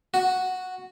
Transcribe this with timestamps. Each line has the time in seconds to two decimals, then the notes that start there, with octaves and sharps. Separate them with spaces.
0.14 F#4